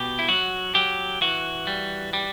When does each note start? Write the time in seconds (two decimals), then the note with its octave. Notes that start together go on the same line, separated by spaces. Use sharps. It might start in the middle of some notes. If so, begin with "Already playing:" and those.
Already playing: B2 G4
0.19 E4
0.29 F#3 F#4
0.75 F#3 G4
1.21 E3 F#4
1.67 G3
2.13 G3